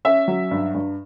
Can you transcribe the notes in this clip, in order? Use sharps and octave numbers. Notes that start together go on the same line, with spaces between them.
C#4 E5
F#3
G2
G2